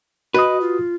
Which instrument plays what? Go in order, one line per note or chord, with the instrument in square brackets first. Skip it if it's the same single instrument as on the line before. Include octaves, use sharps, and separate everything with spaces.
[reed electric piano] F#4 D#6 [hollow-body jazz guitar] B4 [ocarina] D#5
[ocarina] F4